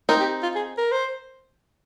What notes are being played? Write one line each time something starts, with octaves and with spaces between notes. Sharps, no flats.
C4 D#4 A#4
G4
F4
G#4
A#4
C5